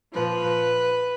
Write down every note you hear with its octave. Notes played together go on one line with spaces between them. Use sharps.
A#2 F3 B4